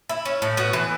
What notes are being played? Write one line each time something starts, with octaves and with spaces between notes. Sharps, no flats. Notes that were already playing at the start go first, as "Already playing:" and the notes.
E4
C#4
A2
B3 F#4
E3